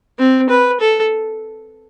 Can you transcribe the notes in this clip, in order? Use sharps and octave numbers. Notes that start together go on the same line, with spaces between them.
C4
B4
A4